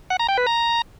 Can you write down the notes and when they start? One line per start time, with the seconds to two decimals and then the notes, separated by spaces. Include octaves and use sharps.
0.10 F#5
0.19 A#5
0.29 G5
0.38 B4
0.47 A#5